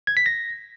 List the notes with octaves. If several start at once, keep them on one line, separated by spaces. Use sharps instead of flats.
G#6
B6
A#6